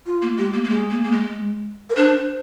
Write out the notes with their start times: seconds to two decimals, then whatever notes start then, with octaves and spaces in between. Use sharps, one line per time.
0.06 F4
0.22 A#3
0.38 G#3 G4
0.54 A#3
0.64 A#3
0.69 G#3 G#4
0.90 A#3
1.04 A#3
1.12 G#3
1.90 A#4
1.96 D4 C5